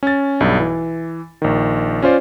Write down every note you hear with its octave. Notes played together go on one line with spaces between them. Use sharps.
C#4 A6
B1 G2
E3
A#1 D#3
C#4 F4 C5 D5